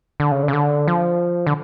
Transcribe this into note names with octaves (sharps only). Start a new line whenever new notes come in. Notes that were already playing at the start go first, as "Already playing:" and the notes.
D3
C#3
D3
C#3
D3
F3
D3